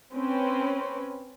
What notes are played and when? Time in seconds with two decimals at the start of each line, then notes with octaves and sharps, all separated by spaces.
0.14 C4 C#4 B4